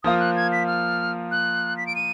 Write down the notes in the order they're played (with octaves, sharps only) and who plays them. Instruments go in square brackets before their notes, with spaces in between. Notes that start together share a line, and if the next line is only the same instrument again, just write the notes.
[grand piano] F3 A#3 F4 [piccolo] D#6
[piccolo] F#6
G#6
B6
F6
F#6
B6
D7
D#7